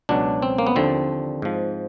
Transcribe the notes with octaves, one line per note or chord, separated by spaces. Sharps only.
C#2 B2 F#3 D4
C4
A#3
B3
D#2 D3 F3 C4
G#2 F3